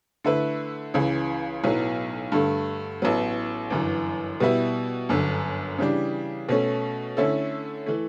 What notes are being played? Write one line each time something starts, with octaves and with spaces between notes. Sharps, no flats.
D3 A3 E4 B4
C#2 C#3 E3
B1 A2 F#3 B3
G2 D3 A3
A1 A2 F#3 B3
G1 F#2 E3
B2 G3 B3 E4
G1 F#2 D3
C#3 E3 G3 D4
B2 A3 C#4
D3 A3 C#4 E4 A4
E3 A3